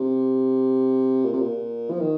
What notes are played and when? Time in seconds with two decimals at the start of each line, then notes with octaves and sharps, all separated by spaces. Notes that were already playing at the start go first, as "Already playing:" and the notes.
Already playing: C3
1.24 A#2
1.33 C3
1.41 A#2
1.91 F3
2.00 D#3